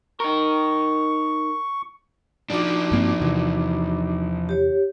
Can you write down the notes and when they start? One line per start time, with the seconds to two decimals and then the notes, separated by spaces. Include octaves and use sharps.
0.20 D#4 A#4 C#6
2.50 F3 D4 D#4 F#4 D6
2.91 G2 A#3 C4
3.20 E2 C3 E3
4.49 G4 C#5